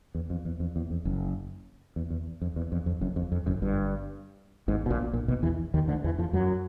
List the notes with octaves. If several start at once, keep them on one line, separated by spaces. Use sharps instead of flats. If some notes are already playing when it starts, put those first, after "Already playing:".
E2
F2
E2
F2
E2
F2
F#1 F#2
E2
E2
F2
E2
F2
F2
F#1 F#2
F2
F2
F#1 F#2
G1 G2
G#1 G#2
B2
A#1 A#2
A#1 A#2
B1 B2
E2 E3
D#2 D#3
D2 D3
E2 E3
F2 F3
F#2 F#3